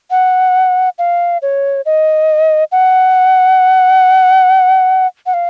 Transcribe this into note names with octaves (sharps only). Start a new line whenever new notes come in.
F#5
F5
C#5
D#5
F#5
F#5
F5